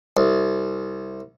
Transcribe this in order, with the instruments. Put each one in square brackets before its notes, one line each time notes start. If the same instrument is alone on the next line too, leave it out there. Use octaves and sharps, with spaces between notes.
[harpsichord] C2